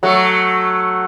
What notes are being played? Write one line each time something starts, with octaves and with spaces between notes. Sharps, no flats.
F#3 A3